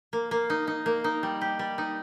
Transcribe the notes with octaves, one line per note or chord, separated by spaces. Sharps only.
A#3
A#3
D#4
D#4
A#3
D#4
G3
G4
G3
D#4